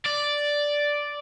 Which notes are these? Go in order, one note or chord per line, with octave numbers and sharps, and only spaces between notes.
D5